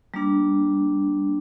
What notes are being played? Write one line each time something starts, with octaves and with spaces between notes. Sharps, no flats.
G3 A#3 D4